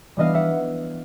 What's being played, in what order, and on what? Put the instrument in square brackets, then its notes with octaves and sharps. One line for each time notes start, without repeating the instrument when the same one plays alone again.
[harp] E3 G3 B3 D4 D#5 F5
E5 F#5